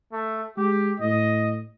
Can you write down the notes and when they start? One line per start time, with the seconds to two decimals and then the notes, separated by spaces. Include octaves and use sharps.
0.12 A3
0.57 G#3 G4
1.00 A2 D#5